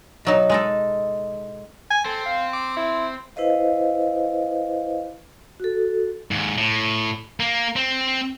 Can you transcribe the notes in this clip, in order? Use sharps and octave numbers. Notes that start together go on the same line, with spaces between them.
B2 F#3 D#4
G#3 D#4 A4
G#5
C4 A4
F5
D6
E4
E4 B4 C5 D#5 F5
F#4 A4
D#2 G#2
A2
A#3
C4